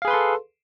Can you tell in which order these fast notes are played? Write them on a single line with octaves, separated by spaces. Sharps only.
F5 G#4 B4 C6 A4